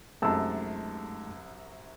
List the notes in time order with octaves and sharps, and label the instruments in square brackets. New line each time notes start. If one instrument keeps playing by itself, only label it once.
[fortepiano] C2 F#2 [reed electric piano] G#3 A3 D#4 [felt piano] A5 E6